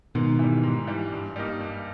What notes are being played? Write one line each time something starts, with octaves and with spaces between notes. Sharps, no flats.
G#2 B2 D#3
E3 G3
G#2
E3 G3
G2
G3 A#3 D#4
G2